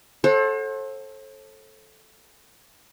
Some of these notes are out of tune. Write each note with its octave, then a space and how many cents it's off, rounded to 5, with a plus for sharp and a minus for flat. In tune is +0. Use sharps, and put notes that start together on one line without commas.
A4 -10 C5 +40 F#5 +0